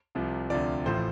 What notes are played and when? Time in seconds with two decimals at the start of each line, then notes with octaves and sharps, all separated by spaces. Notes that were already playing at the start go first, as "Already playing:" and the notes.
0.15 C2 C3 F3
0.50 D2 C3 F3 D5
0.85 A1 A2 F3 C5